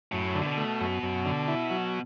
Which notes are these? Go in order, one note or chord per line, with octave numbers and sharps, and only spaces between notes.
F#2 A2
D3
A2
B2
A3
F#2
F#2
D3
E4
F#3